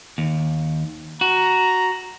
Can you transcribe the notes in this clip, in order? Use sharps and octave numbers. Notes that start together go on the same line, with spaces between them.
D#2
F#4 A#5